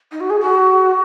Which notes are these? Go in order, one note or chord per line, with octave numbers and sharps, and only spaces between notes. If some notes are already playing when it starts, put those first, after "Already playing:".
D#4
F#4
G#4
F#4